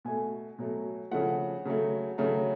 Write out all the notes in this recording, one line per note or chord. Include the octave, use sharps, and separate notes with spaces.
B2 A3 G#5
B2 F#3 A3
C#3 F3 A3 F#5
C#3 F#3 A3
C#3 F#3 A3